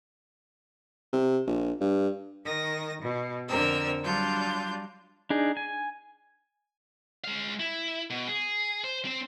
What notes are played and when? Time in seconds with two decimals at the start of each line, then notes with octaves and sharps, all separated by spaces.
1.13 C3
1.47 A#1
1.81 G2
2.45 D#3 D#6 A#6
3.02 B2
3.48 F2 D3 C4 A#4 E6
4.03 F#3 G3 D4 F4 G6
5.30 D4 D#4 G#4
5.57 G#5
7.24 G#3 F5
7.60 E4
8.10 B2
8.28 G#4
8.84 C5
9.05 C4 C5